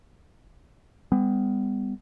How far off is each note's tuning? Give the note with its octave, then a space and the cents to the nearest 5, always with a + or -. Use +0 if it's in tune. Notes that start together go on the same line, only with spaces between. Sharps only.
G3 +45 B3 +30